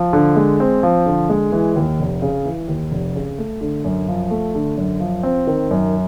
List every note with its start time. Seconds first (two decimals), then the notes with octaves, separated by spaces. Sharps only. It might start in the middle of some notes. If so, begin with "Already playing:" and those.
Already playing: F3
0.13 D3
0.36 G#3
0.60 C4
0.83 F3
1.06 D3
1.30 G#3
1.52 E3
1.76 D#2
1.99 F1
2.22 C#3
2.45 E3
2.68 D#2
2.91 F1
3.15 C#3
3.38 A3
3.61 D3
3.84 F#2
4.08 F3
4.31 A3
4.55 D3
4.77 F#2
5.00 F3
5.23 C4
5.47 D#3
5.71 F#2